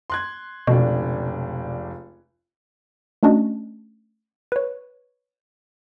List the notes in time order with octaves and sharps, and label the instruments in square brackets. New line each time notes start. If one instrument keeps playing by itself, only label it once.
[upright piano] C6 F#6 G#6
[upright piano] F1 C#2 D4 [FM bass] B2
[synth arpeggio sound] A3 C#4 D4 F#4 D#5
B4 C#5